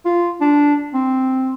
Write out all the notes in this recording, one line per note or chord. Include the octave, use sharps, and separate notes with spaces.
F4
D4
C4